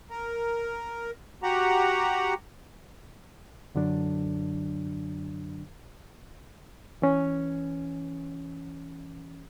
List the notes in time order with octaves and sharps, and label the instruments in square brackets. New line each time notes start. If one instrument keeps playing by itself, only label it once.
[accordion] A#4
F#4 G4 F#5 A#5
[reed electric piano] F#2 D3 F#3 D4
E3 C#4